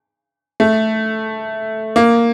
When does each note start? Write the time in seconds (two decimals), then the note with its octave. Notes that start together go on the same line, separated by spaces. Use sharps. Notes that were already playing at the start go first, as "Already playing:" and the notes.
0.60 A3
1.96 A#3